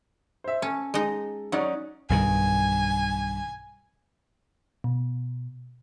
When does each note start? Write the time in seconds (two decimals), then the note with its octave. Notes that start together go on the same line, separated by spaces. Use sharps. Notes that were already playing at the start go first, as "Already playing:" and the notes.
0.44 C5 E5
0.62 C#4 A4
0.94 G#3 D#4
1.52 F#3 C#4 D#4 D5 F#5
2.09 B1 G2 D#3 G#5
4.84 B2